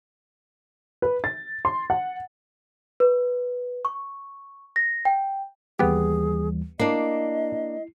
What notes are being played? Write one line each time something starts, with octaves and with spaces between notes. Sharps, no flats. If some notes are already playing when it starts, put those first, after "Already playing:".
B4
A6
C6
F#5
B4
C#6
A#6
G5
D#2 E3 G3 B3 G4 G#4
A#3 D4 E4 D#5 C7